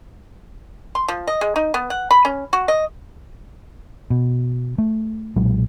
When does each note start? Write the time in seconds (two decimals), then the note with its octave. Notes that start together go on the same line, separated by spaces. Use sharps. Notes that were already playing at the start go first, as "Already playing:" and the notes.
0.95 C6
1.08 F3
1.27 D#5
1.41 G#3
1.56 D#4
1.74 B3
1.90 F#5
2.11 B5
2.25 C#4
2.53 F#4
2.68 D#5
4.10 B2
4.78 A3
5.36 B1 A#2 F#3 G#3